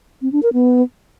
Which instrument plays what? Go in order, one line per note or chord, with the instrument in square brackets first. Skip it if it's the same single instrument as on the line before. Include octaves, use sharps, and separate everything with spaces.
[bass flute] C4
D4
A#4
B3